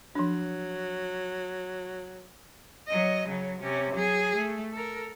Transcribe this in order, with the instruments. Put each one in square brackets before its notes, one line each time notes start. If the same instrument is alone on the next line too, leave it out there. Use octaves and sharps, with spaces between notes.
[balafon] F3 D4 [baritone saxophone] F#3
[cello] F#3 D#5
C#3 F#3
C3 C#4
F#3 G#4
A3
A4 A#4